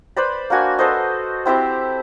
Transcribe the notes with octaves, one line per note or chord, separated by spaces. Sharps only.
B4 C5 D5 B5
A#3 D4 F#4 G#5
A4 B4 C5 D#5
C4 E4 G4 C5